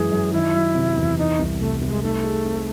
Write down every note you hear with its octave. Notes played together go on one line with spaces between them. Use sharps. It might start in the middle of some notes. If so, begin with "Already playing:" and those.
Already playing: F#2 E3 G#3 G#4
F#2
D#3 E4
F#3
C3
E2
E3 D#4
C2
C3 A3
C2
G#3
A3 D#4
G#4
C4